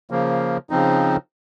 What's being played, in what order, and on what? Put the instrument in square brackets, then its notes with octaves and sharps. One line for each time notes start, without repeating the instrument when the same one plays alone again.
[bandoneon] C#3 F3 A#3
C#3 F3 C4 D#4